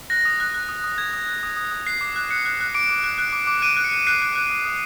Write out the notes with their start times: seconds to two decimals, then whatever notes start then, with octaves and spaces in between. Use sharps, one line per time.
0.10 F#6 A#6
0.25 D#6
0.40 F#6
0.54 F#6
0.69 D#6
0.84 D#6
0.98 D#6 G#6
1.13 D#6
1.28 F#6
1.43 D#6
1.57 D#6
1.71 D#6
1.86 F#6 C7
2.01 D6
2.16 F#6
2.31 F#6 C#7
2.45 F#6
2.60 F#6
2.75 D6 D7
2.90 D6
3.04 F#6
3.18 F#6
3.33 D6
3.47 D6
3.58 D7
3.62 F#6 D#7
3.77 F#6
3.84 C#7
3.92 F#6
4.07 F#6 C7
4.22 F#6
4.35 F#6
4.50 D#6
4.65 D#6